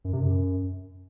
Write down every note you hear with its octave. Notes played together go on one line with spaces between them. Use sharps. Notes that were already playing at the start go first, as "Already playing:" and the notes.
F#2
C3
F#2